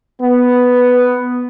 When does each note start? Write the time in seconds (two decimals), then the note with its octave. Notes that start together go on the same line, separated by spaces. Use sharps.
0.21 B3